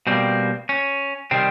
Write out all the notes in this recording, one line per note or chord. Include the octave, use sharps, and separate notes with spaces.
B2 G3 A#3 C4
C#4
C3 D#3 G3 C4